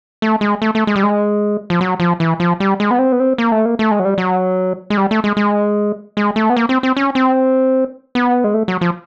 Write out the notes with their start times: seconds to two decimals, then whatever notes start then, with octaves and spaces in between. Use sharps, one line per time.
0.22 A3
0.41 G#3
0.62 A3
0.75 A3
0.87 G#3
0.96 G3
1.03 G#3
1.70 F3
1.81 F#3
2.00 F3
2.20 E3
2.40 F3
2.60 G3
2.80 G#3
2.91 B3
2.99 C4
3.12 B3
3.20 C4
3.38 A#3
3.52 A3
3.66 A#3
3.79 A3
3.91 G#3
3.99 F#3
4.05 G3
4.18 F#3
4.90 G#3
4.97 G3
5.11 A3
5.24 G#3
5.37 G#3
6.17 G#3
6.36 A3
6.50 B3
6.57 A#3
6.69 C4
6.83 C4
6.97 C#4
7.15 C4
8.15 B3
8.44 G#3
8.54 A3
8.68 F#3
8.81 F3